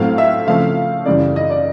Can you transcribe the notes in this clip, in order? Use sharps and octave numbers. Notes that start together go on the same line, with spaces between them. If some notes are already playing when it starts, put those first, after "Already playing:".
Already playing: A2 F#3 A3 C4 F5
E5
C#3 F3 A3 C4 F5
F#2 C#3 E3 G3 D5
D#5
D5